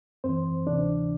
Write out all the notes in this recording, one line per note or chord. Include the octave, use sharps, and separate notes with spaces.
F#2 E3 C4 C5
D2 C3 E3 D4 D5